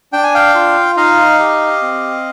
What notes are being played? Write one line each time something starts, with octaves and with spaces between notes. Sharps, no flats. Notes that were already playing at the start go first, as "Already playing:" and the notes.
D4 G5
G#5
F5 G5
F4
D#4 D#5 F5
G4
C4